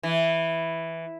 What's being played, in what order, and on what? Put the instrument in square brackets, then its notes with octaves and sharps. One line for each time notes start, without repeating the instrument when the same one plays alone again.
[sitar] E3